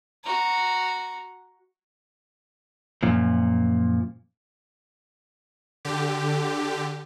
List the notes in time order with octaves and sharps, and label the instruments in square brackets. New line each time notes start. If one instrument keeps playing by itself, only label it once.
[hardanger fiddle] F#4 A#5
[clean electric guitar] F#2 A#2 F3
[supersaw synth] D3 G4